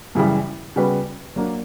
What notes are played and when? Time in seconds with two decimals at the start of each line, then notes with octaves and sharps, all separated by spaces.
0.15 F#2 C#3 E3 G3
0.76 C#3 G3 B3 F#4 B4
1.36 F#3 A#3 D4